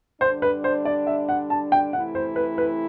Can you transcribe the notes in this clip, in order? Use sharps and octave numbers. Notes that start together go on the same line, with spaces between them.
D3 G3 D4 C5
B4
C5
D5
E5
F#5
A5
G5
C3 E3 A3 E4 F#5
C5
B4
B4